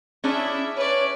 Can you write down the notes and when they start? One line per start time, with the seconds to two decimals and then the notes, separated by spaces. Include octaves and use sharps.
0.24 C#4 D4 E4 G#4 E5
0.76 B4 C#5 D5